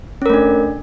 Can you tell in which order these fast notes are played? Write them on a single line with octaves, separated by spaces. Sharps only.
C#4 A#4 A3 D4